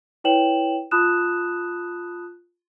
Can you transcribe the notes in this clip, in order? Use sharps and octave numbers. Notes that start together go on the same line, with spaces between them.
E4 B4 C#5 G5 E7 F#7
F4 A5 B5 D#6 F#6 E7